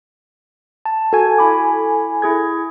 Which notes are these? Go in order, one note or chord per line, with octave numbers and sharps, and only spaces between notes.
A5
F#4 A4 G#5
E4 B5 D6
E4 G#4 G#6